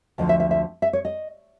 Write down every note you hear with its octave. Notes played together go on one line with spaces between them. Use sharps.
D2 D3 F3 D#5
E5
E5
E5
E5
C#5
D#5